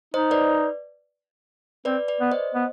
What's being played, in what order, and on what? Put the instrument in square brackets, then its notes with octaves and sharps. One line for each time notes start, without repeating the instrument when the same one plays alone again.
[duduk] D#4 [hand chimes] C5 D#5
[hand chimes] B4 D5
[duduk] C4 [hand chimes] B4 D5
[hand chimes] B4 D5
[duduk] B3
[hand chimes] C5 D#5
[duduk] B3